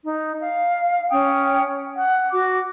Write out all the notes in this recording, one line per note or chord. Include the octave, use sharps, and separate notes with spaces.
D#4
F5
C#4 G5 D#6
F#5
F#4 D6